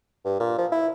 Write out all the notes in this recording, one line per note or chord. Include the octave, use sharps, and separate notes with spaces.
G2
A#2
F3
E4